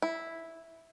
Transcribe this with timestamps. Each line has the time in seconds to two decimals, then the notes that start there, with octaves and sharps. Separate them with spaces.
0.02 E4